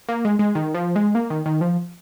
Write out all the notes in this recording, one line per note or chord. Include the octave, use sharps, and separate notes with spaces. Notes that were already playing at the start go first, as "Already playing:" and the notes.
A#3
G#3
G#3
D#3
F3
G#3
A#3
D#3
D#3
F3